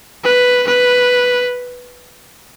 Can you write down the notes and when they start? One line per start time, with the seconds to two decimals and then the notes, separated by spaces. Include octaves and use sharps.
0.24 B4
0.67 B4